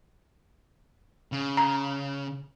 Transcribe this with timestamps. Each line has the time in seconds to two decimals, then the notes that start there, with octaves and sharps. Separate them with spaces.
1.32 C#3
1.57 A#5